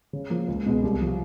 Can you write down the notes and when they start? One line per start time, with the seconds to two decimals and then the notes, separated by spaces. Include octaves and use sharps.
0.13 C#3
0.30 F3 A#3
0.48 C#2
0.66 B2 G#3 B3
0.83 C2
1.01 C3 F3